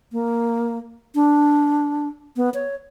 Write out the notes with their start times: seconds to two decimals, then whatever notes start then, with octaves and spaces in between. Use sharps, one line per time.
0.12 A#3
1.15 D4
2.37 B3
2.54 C#5